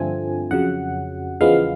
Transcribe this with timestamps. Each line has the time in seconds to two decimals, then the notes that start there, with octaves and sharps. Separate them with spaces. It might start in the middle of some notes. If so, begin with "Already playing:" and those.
Already playing: G2 D3 F3 A3 C4 G#5
0.51 F2 C#3 F#3 F#5
1.41 E2 C#3 F3 G#3 B3 F5